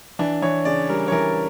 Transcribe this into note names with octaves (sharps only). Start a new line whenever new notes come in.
E3 D4
E3 C#5
C#3 D5
G3 A#4
C#5
E3 A#4